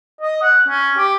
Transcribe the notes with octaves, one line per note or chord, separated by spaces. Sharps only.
D#5
F#5
C#4
G4